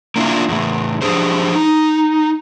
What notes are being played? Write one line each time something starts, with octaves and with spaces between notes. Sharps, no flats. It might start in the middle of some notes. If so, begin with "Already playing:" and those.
A#3 D4 E4 F4
E2 A2
F3 F#3 D4 G4 G#4 C5
D#4